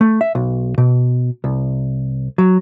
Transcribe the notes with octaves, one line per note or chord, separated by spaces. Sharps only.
A3
E5
B1
B2
C2
F#3